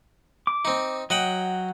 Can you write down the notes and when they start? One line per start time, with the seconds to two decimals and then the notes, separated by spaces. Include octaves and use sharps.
0.47 D6
0.65 C4 D#4
1.10 F#3 D#5 F#5 G5